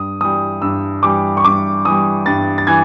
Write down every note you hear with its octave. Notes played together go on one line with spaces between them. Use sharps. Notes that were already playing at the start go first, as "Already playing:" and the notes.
Already playing: G2 D#6
E3 G3 D#6
G2 E6
E3 G3 D6
C#6
G2 D6
E3 G3 D#6
G2 A6
A6
E3 G#6